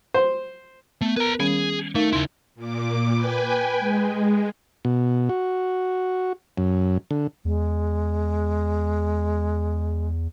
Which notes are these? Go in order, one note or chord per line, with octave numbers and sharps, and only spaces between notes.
C5
A3 B3
A#4 B4 A#5
D#3 G3 C#4 G#4
A3 D#4 A#4 F5
D#2 C#3 E4 C6
A#2 D6
B4 G5 G#5
G#3
B2
F#4
F#2
D3
E2 G#3